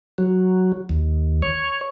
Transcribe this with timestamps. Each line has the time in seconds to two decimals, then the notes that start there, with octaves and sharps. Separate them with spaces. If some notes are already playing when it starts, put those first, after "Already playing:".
0.18 F#3
0.89 D#2
1.42 C#5